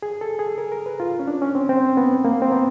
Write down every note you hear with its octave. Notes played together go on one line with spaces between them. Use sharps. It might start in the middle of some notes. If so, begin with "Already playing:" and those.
G#4
A4
G#4
A#4
A#4
B4
F4
C#4
D4
C#4
C4
C4
B3
A#3
C4
B3